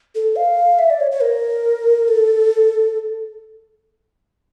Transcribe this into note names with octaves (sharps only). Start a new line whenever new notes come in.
A4
F5
E5
D5
C#5
C#5
A#4
A4